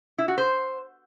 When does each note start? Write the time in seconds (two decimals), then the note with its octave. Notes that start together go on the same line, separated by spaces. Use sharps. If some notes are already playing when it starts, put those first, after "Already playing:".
0.18 E4
0.28 F#4
0.38 C5